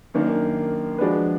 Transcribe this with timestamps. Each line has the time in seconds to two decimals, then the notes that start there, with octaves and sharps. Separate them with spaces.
0.14 F#2 D#3 A#3 D4
0.98 F3 G#3 D4 F#4 B4